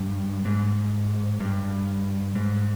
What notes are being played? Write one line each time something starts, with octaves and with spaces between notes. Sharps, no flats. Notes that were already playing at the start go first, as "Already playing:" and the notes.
Already playing: G2
G#2
G2
G#2